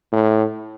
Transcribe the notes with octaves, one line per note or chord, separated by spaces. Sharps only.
A2